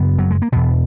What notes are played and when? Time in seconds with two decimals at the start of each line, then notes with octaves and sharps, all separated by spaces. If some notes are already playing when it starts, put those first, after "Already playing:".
Already playing: F#2 C#3 B3
0.19 F#3
0.31 G#3
0.42 A#3
0.52 E2 B2 B3